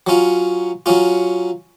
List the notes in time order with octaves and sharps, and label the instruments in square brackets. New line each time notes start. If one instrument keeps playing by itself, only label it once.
[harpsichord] F#3 C#4 F4
F#3 C#4 F4